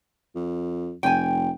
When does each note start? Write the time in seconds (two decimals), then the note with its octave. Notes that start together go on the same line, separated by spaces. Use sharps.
0.35 F2
1.03 F1 G5 G#5